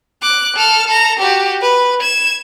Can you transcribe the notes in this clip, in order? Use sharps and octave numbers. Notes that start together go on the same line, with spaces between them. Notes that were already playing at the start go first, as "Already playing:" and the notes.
D6 F#6
A4 F6
A4 A#5
F#4 G4
B4
G#6 E7